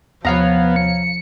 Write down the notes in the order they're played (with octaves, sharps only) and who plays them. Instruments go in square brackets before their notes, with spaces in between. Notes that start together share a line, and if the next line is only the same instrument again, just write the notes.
[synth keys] D#2 C3 [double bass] F3 [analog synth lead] B3 [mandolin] C#5 F5 A#5
[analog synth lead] C#7